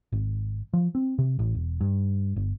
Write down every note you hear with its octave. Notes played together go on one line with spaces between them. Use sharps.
G#1
F3
C4
C3
A1
E1
G2
G1